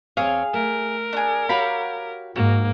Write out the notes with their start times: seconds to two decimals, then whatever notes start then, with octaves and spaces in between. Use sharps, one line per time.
0.17 E2 C4 G#4 C#5 F5
0.54 A3 A#4
1.13 D4 G#4
1.49 F#4 G4 C#5 F5 A#5 B5
2.36 G#2 A#3 F#4